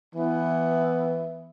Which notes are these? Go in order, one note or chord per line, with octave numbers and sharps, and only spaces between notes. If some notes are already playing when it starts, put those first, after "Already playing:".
E3 B3 E4